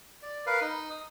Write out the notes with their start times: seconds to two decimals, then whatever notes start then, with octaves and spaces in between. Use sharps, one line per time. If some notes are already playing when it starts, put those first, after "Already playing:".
0.22 D5
0.46 A#4 B4 F5
0.61 D#4
0.90 D#6